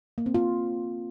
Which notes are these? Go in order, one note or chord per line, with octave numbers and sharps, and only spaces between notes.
A#3
C4
F4